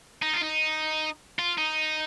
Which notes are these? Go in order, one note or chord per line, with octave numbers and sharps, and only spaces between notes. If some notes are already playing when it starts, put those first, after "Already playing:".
D#4
F4
D#4
F4
D#4